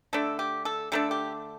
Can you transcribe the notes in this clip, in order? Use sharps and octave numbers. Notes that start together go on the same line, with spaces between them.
D3 A3 D4 A4
G4
A4
D3 A3 D4 A4
G4